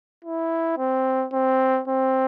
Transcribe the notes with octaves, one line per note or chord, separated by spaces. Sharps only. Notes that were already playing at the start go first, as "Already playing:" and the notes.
E4
C4
C4
C4